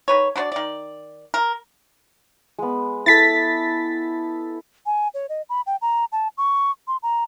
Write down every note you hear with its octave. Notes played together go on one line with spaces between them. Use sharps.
D#3 B4 C#5
D4 F#4 B4 D5
D#3 D5
A#4
G#3 B3
E4 A4 A6 B6
G#5
C#5
D#5
B5
G5
A#5
A5
C#6
C6
A#5